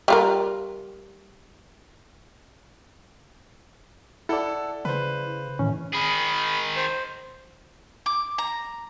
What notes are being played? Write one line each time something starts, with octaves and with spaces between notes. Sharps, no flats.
G3 F4 A#4
E4 A4 D5 F#5 A5
C#3 B4 C5
A2 D#3 E3 C#4
D#3 G#4 B5
C5
D6
A#5